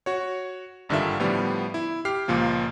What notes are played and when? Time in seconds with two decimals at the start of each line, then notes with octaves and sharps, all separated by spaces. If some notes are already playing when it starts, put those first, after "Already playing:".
0.06 F#4 C#5
0.89 G#1 G2 D3 D#3 F4 E5
1.20 A2 D3 F3 G3 B3
1.74 E4
2.05 G4 F6 C7
2.28 C#2 A#2 F3 A#3